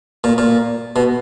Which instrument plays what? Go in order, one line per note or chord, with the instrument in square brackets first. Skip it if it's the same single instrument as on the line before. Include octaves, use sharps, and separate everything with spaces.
[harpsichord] A#2
A#2
B2